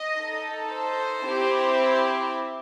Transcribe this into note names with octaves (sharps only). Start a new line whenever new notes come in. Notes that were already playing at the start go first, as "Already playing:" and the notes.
Already playing: D#5
D#4 A4
C5
C4 E4 G4